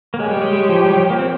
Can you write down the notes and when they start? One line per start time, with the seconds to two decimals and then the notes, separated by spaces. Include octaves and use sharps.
0.14 A#3
0.19 G#3 G4 C#5 G5
0.31 G3
0.41 G#3
0.53 G#3
0.69 F3
0.86 G3
0.93 F3
1.10 A#3
1.19 C4